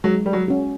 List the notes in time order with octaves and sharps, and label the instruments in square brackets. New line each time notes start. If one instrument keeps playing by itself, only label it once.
[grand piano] F#3 [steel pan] G#3
[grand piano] G3
F#3
[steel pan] C#4 F#4